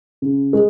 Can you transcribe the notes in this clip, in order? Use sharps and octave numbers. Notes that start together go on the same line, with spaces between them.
C#3
G#3